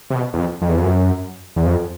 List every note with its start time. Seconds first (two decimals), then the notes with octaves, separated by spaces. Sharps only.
0.10 C3
0.15 B2
0.33 E2
0.38 F2
0.62 F2
0.69 E2
0.77 F2
0.84 F#2
1.56 E2
1.66 F2